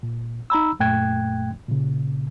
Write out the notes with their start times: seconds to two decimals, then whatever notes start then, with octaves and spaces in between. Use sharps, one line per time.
0.03 A#2
0.50 D#4 A#5 B5 E6
0.80 F#2 A#2 A3 G5 F#6 G#6
1.69 A#2 C#3